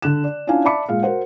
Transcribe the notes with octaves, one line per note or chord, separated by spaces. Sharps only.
D3 F#6 E7
D5
C#4 D4 E4 F4 F5 G#5
D5 E5 A5 B5 D6 C#7
A#2 G#3 F5
F#4 A#4 C5 F#5